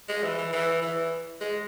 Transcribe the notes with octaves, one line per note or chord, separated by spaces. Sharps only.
G#3
E3
E3
E3
E3
G#3